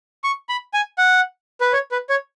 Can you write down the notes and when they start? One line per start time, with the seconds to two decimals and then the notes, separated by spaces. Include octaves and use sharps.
0.24 C#6
0.49 B5
0.74 G#5
0.98 F#5
1.61 B4
1.73 C#5
1.92 B4
2.10 C#5